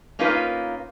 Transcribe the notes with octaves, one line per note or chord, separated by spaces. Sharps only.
A#3 C#4 D#4 F4 A#4 B4